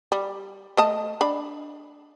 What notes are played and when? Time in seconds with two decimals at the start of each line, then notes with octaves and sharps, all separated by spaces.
0.12 G3
0.77 A3 D#5 A5
1.21 D4 B5